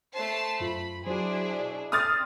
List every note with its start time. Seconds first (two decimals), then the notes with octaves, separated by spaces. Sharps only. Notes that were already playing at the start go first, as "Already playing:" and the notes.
0.14 A3 C5 A5 C7
0.60 F#2 F4 B5
1.06 F#3 D4 E4 F#4 G#4 C5
1.60 B2 D5
1.92 C4 D#6 F6 A6